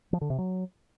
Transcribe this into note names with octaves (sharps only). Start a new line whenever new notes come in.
F3
D3
C3
F#3